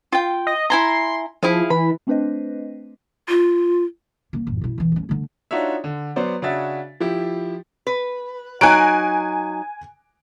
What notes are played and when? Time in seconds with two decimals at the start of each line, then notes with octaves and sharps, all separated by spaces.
0.12 F4 G5
0.47 D#5
0.70 E4 G#5 A#5 C6
1.43 F3 E4 G#4 F5
1.70 E3 B5
2.07 A3 C4 D4 B4 C5 D#5
3.29 F4
4.33 C2 A#3
4.47 A1 F#2
4.61 B2 E4
4.78 E1 E3
4.92 D2 C#4
5.09 D3 A3
5.51 D4 D#4 F4 F#4 C#5 E5
5.84 D3
6.16 F#3 B3 C5 D5
6.42 C#3 D4 F#4 C#5 E5 A6
7.00 F3 E4 G4
7.87 B4
8.61 F#3 D#4 G#5 F#6 D7